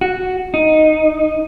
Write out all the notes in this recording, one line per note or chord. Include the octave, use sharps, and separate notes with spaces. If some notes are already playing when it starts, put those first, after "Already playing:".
F#4
D#4